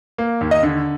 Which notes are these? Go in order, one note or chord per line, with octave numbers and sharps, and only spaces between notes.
A#3
D#2
D#5
D3